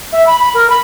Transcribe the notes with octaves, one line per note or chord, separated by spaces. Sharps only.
E5
B5
B5
A#4
B5